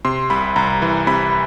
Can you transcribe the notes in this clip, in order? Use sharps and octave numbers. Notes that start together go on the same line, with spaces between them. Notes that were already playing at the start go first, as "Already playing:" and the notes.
C3 C6
C2 B5
C2 A#5
E3
C3 B5